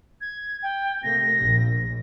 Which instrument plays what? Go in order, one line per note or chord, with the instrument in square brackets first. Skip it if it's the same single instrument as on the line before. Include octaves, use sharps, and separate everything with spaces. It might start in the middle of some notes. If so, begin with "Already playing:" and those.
[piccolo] G#6
G5
[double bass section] C3 A3 A#3 [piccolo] A#6
[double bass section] A#1